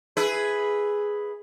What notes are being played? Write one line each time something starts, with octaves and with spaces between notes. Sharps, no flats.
E4 G#4 B4